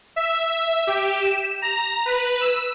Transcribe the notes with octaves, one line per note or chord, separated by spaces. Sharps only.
E5
E5
G4
E7
A#5
B4
E6